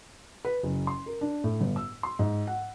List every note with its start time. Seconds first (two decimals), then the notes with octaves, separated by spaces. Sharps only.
0.45 B4
0.63 F#1
0.87 C6
1.06 A#4
1.21 D4
1.44 A2
1.61 G1
1.76 E6
2.03 C6
2.19 G#2
2.47 F#5